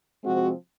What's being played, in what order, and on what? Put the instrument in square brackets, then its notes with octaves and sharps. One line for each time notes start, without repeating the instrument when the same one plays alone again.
[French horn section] C3 F3 G#3 C4 F#4